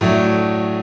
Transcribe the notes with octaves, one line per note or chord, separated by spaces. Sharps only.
A2 F#3 A3 D4